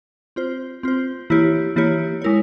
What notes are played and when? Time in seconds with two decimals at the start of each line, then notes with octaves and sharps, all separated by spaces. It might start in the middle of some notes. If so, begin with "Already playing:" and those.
0.36 C4 F4 C5
0.83 C4 F4 C5
1.30 E3 A#3 E4 G4 C#5
1.76 E3 A#3 E4 G4 C#5
2.22 G#3 E4 A#4 C#5